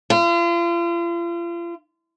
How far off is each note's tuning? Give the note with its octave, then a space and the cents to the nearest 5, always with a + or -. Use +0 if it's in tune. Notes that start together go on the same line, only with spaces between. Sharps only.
F4 -40